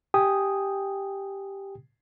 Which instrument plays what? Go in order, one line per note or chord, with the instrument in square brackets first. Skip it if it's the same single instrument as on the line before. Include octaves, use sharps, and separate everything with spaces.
[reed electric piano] G4 G5 G#5 D#6